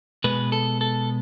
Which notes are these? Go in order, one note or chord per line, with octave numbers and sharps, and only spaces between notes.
B2 G#3 B3 B4
A4
A4